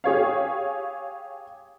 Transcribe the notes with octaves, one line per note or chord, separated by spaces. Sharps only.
G4 G#4 C#5 F5